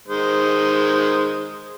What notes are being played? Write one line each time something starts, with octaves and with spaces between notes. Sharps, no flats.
D#3 G#3 C5